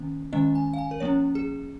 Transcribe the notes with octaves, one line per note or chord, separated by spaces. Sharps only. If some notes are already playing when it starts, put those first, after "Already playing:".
Already playing: D#3 A#3 C#4
D#3 G#3 C#4 D#5
G#5
F5
G#5
A#4
F3 A#3 C#4 C#5
G#4